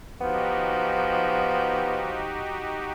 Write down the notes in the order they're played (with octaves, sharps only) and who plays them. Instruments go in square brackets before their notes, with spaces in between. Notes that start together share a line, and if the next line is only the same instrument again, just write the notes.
[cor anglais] F3 [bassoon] B3 [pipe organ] D#4 F#4 G4